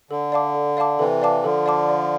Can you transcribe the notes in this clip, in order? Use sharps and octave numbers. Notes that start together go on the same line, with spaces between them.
D3 A4
D5 F5 A5 D6
A4
D5 F5 A5 D6
C3 E3 A4
D5 F5 A5 D6
D3 F3 A4
D5 F5 A5 D6
D5